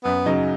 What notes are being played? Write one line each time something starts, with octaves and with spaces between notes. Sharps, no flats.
F#2 B3
C#3 F#3 D#4